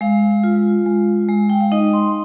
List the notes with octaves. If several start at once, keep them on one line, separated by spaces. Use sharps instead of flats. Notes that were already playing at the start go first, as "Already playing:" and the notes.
G#3 F5
F4
G#3
G#3
G5
F5
D#4 D#5
C6